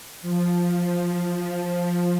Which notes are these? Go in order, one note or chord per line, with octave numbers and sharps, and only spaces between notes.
F3